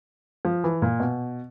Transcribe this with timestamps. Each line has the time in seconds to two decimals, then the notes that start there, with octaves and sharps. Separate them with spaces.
0.45 F3
0.64 E3
0.82 A#2
1.00 B2